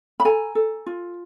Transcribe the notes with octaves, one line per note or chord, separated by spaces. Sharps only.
B5
A4 G#5 A#5
A4
F4